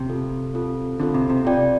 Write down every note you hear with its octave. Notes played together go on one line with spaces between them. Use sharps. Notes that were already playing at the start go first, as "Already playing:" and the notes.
Already playing: C3
C4 F4 A4
C4 F4 A4
D3 C4 F4 A4
C3
C3
C3 C4 F4 D5 G5